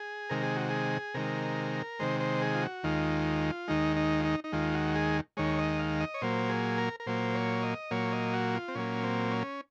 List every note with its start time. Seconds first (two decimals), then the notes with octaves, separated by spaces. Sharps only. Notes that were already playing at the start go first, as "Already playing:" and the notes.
Already playing: G#4
0.29 C3 D#3 G#3 A#4
0.43 G#4
0.56 F#4
0.70 G#4
1.14 C3 D#3 G#3 A#4
1.99 C3 D#3 G#3 C5
2.20 C5
2.42 G#4
2.55 F4
2.62 F#4
2.83 D#2 D#3 G#3 F4
3.68 D#2 D#3 G#3 D#4
3.97 D#4
4.20 F4
4.25 D#4
4.44 D#4
4.52 D#2 D#3 G#3 F4
4.74 F#4
4.95 G#4
5.37 D#2 D#3 G#3 C#5
5.59 D#5
5.79 F5
6.00 D#5
6.14 C#5
6.22 A#2 F#3 A#3 C5
6.50 G#4
6.78 A#4
7.00 A#4
7.07 A#2 F#3 A#3 C5
7.34 C#5
7.62 D#5
7.91 A#2 F#3 A#3 C#5
8.13 D#5
8.33 F#4
8.54 F4
8.68 C4
8.75 A#2 F#3 A#3 C#4
9.03 C4
9.31 C#4